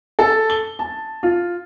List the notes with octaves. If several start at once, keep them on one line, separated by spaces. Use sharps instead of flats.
A4
G7
A5
F4